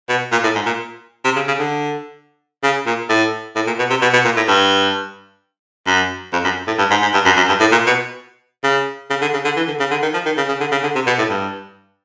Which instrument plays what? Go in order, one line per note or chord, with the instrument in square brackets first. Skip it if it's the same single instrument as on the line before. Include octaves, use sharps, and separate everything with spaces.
[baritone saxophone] B2
A#2
A2
G#2
A#2
C3
C#3
C#3
D3
C#3
A#2
A2
A2
A#2
B2
C3
B2
B2
A#2
A2
G2
F#2
F2
F#2
A2
G2
G#2
G#2
G2
F#2
F#2
G2
A2
A#2
B2
C#3
C#3
D3
C#3
D3
E3
D3
C#3
D3
D#3
F3
D#3
C#3
C#3
D3
C#3
D3
C3
B2
A2
G2